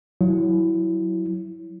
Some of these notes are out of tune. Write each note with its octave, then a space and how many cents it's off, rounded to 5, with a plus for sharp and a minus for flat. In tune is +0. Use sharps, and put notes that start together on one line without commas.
F#3 +0 E4 +0